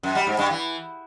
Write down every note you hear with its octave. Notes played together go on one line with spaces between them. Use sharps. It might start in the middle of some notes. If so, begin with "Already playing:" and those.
F#2
G3
G#2
G2
E3